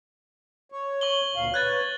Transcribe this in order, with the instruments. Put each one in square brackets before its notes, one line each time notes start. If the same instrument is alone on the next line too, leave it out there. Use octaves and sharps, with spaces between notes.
[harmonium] C#5
[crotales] C#6 F#7 G7
[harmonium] D2 A#2 F5
[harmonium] B4 C#5 [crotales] F#6 G#6 A6